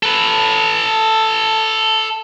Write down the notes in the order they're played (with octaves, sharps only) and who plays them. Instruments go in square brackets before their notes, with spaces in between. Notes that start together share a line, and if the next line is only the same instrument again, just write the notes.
[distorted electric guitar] A4 B4